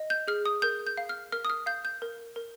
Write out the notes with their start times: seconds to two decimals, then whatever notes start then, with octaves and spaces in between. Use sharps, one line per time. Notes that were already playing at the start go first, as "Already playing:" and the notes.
Already playing: D#5
0.10 G6
0.28 G#4 F6
0.46 D#6
0.62 A#4 G6
0.87 G6
0.97 F5
1.09 F6
1.32 A#4 F6
1.45 D#6
1.50 F6
1.66 F5 G6
1.85 G6
2.02 A#4
2.36 A#4